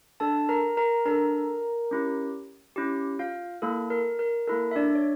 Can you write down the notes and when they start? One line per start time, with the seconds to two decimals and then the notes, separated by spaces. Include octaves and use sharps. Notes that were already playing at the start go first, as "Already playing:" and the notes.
0.20 D4 A4 A5
0.49 A#4 A#5
0.77 A#4 A#5
1.06 D4 A4 A#4 A#5
1.91 C#4 E4 G4
2.76 C#4 E4 G4
3.19 F4 F5
3.62 A#3 E4 A4
3.90 A#4
4.19 A#4
4.47 A#3 E4 A4 A#4
4.71 E5
4.76 D4 D5
4.95 C#5